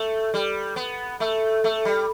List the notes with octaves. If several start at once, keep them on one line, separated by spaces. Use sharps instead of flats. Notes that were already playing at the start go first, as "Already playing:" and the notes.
Already playing: A3
G3
B3
A3
A3
G3